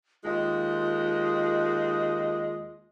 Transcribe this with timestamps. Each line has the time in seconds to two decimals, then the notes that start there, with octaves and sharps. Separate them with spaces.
0.24 D#2 G#3 F4 D#5